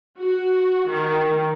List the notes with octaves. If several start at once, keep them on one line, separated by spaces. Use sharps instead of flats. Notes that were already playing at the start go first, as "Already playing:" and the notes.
F#4
D#3